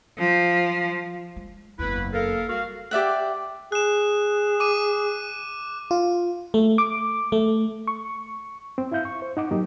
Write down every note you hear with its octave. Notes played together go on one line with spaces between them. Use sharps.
F3
G#3
F#1 E2 E4 B4
A4 A#4 F5
G3 F#4 F5
G4 D5 E5 F#5
G#4 F#6 E7
D6 D#7
F4
A3
D6
A3
C#6
C4
E4 E5 F5 G6
C#6
C5
D#4 F#5 D6
F#3 A#3 D#4 G4